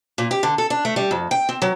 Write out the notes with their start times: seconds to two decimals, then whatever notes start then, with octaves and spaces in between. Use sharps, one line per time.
0.18 A#2
0.31 G4
0.43 D3
0.58 A4
0.70 D4
0.85 A3
0.96 G3
1.11 F2
1.31 G5
1.49 C4
1.62 F#3